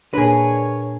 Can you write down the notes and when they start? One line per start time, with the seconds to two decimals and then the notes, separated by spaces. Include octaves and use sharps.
0.13 A#2 D4 G#4 A#4 B4 C#5